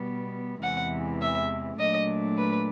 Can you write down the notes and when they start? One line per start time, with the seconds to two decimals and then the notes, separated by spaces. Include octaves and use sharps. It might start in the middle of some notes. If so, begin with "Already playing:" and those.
Already playing: B2 G3 B3
0.62 E2 C3 E3 G#3 F#5
1.21 E5
1.79 A#2 F#3 A3 D4 D#5
2.38 B4